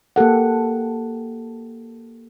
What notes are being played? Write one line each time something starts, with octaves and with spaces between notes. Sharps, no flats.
A#3 G4 A4 F#5